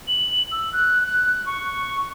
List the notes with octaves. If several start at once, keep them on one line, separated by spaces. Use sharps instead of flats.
F#7
E6
F#6
F#6
C#6